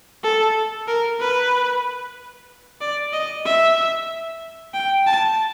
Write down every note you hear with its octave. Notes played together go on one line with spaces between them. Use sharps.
A4
A#4
B4
D5
D#5
E5
G5
A5